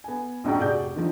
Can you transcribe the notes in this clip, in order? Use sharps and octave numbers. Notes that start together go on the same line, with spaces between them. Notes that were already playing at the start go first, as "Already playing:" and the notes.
B3 G#5
A#1 F2 G#2 C#4 F#4 G5
F1 F#4 G#4 D5 G6
D3 D#3 F3